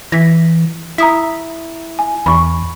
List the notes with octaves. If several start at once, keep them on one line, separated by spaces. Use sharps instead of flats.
E3 A#6 B6
E4 A#5 D#6 B6
G#5
E2 B5 C#6